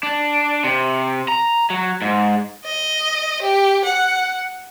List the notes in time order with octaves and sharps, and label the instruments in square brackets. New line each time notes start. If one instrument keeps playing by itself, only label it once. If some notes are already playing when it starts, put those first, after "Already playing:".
[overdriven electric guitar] D4
C3
A#5
F#3
G#2
[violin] D#5
G4
F#5